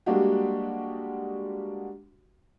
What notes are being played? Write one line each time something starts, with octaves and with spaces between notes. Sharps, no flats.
G3 G#3 A#3 D4 F#4 G4